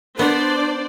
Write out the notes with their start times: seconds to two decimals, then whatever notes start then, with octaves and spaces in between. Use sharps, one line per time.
0.19 B3 D4 C5 D5